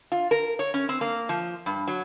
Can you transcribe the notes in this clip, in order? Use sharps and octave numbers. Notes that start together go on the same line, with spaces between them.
F4
A#4
C#5
C#4
C4
A#3
F3
G2
F#3